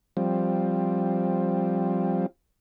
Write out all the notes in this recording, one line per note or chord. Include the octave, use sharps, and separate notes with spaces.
F3 G3 C4